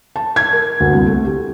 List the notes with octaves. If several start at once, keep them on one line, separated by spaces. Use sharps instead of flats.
A5
G#6
A#4
D2
C2
A3
G4